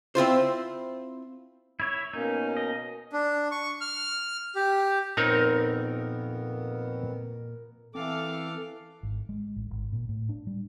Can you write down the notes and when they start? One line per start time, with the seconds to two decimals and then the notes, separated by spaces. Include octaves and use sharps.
0.15 C4 E4 F4 C5
1.80 E4 C#5 E5
2.13 B2 A#3 C#4 D#4
2.57 D#5
3.13 D4
3.51 C#6
3.81 F6
4.55 G4
5.17 F2 A#2 B3 C4 D#4 A#4 C#5
7.95 E3 C4 A4 F5 D6
9.03 G#1
9.29 G#3
9.56 A1
9.71 G#1
9.92 A#2
10.09 A2
10.29 D4
10.47 G3